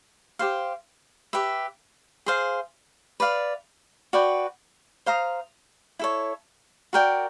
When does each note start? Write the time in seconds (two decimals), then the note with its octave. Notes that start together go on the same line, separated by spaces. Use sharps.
0.39 G4 C5 F5
1.33 G4 B4 E5
2.26 G#4 C5 F5
3.20 B4 D5 F5
4.13 F#4 B4 D5 G5
5.06 C5 F5 A#5 D#6
5.99 E4 A4 C#5
6.93 F#4 A#4 D5 G5